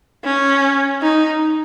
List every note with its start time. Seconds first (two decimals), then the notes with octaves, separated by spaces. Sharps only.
0.25 C#4
1.02 D#4